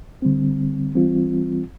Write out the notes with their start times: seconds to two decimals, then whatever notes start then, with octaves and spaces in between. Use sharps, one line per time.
0.22 D3 G3 C4
0.94 E3 G3 C4 F4